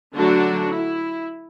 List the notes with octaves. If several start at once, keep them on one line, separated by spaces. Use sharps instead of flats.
D3 F#3 A3 D4 F#4
E4